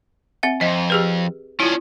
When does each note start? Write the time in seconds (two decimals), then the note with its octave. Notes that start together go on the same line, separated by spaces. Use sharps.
0.43 C4 E5 F#5
0.61 F2 D#5
0.90 G4 G#4 B4
1.60 C#4 D4 E4 F4